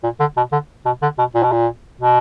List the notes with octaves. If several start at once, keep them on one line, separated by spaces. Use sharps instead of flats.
A#2
D3
B2
D3
B2
D3
B2
A#2
B2
A#2
B2